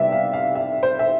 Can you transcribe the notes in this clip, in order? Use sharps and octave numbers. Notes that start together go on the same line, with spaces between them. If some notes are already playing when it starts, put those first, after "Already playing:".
Already playing: C3 G3 B3 D5 E5
F5
F5
E5
C5
E5